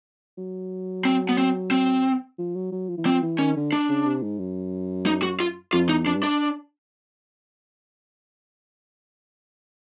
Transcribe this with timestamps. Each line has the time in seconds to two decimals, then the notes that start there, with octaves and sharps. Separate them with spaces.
0.38 F#3
1.05 C4
1.29 B3
1.38 C4
1.71 C4
2.38 F3
2.55 F#3
2.72 F#3
2.89 F3
2.98 E3
3.05 F3 C4
3.23 E3
3.39 D#3 C#4
3.56 D3
3.72 D4
3.89 C#3
4.06 C3
4.23 G#2
4.39 F#2
5.06 D#4
5.23 F#4
5.40 F4
5.73 F2 F4
5.89 E2 D#4
6.06 F2 D4
6.15 G2
6.23 D4